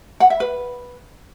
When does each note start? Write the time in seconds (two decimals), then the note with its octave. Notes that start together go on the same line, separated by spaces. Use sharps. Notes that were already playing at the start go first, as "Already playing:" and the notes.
0.20 F#5
0.30 E5
0.40 B4